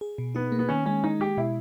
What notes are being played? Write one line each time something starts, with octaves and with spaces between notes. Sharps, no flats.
G#4
B2
B3 D#4
A#3
B3
D#3 C#4
G#3 C#4
G#3 D#4
G#3 G4
B2 E4